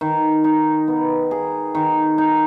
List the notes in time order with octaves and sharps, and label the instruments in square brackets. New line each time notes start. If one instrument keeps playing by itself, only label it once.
[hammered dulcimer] D#3
D#4
B3
G#4
D#3
D#4